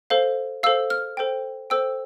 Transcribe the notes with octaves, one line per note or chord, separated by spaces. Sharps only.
A4 C5 F5
A4 C5 F5 E6
F6
A4 C5 G5
A4 C5 G5 E6